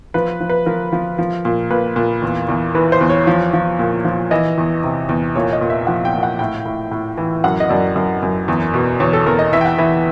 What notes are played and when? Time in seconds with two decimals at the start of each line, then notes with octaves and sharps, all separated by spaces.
0.14 F3 B4
0.40 F3
0.49 B4
0.66 F3 A#4
0.93 F3
1.18 F3
1.45 A#2
1.70 A#2 B4
1.96 A#2
2.22 E2
2.49 E2
2.75 E3 B4
2.92 C5
3.01 E2
3.10 C#5
3.27 F3
3.53 F3
3.79 A#2
4.05 F3
4.31 E3 D#5
4.58 E2
4.84 C3
5.09 E2
5.35 A#2 C#5
5.53 D#5
5.61 A#2
5.70 E5
5.87 F3 F#5
6.05 G5
6.14 A#2
6.23 F#5
6.39 A2 G5
6.65 A2
6.91 A2
7.17 E3
7.44 F#2 F#5
7.60 D#5
7.69 F#2 D5
7.96 F#2
8.22 F#2
8.48 E2
8.74 B2
9.00 E2 C#5
9.13 A4
9.26 E2 A#4
9.39 D#5
9.53 E3 E5
9.61 G5
9.65 F#5
9.78 E3 E5